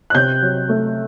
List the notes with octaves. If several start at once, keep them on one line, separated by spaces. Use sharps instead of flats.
F#6
C3 G6
F#3
A3